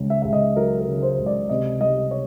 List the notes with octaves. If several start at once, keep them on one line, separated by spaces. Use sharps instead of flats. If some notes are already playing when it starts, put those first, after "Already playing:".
Already playing: C#2 C#3
E5
C#2 E5
D#5
F#3 A#4
A#4
C#3
C5
C#2
D5
C3 D#5
G3 D#5
C#5